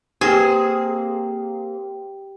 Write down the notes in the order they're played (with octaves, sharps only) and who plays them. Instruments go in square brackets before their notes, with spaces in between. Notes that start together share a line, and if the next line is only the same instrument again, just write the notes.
[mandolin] A#3 C4 C5 [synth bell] G4 G5 [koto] G#4